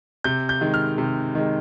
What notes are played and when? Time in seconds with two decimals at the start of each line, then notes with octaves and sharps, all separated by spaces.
0.24 C3 G6
0.49 G6
0.61 D#3 G#3
0.74 F6
0.98 C3
1.35 D#3 G#3